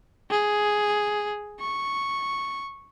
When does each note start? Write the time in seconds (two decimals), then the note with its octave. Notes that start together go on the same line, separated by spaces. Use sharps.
0.31 G#4
1.60 C#6